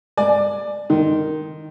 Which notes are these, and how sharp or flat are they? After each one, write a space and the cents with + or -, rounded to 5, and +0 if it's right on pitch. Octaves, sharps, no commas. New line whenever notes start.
D5 +15 G#5 +20
D#3 +0 C6 +0